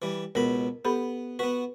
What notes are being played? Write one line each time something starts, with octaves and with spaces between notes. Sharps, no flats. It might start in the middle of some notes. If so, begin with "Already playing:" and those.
E3 G3
C#2 B2 A#4 B5
B3 G4 A4 B5
B3 F#4 B4